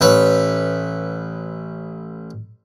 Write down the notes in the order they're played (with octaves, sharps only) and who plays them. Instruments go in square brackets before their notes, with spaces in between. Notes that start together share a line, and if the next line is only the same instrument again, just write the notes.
[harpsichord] A1 B4 C#5